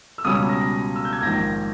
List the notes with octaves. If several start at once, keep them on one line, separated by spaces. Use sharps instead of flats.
E6
C#2 B2 G3 C#4 D#6
A#6
E6
G6
G#6
A#1 G#2 D#3 A#6